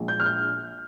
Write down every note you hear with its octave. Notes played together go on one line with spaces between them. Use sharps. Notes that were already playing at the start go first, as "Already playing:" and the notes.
Already playing: A#1 A#2 F3 G#3
G6
F6
G6